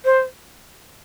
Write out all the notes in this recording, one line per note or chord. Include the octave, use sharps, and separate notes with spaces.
C5